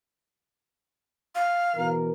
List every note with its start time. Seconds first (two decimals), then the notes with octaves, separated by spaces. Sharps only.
1.35 F5
1.76 B2 E3 A#4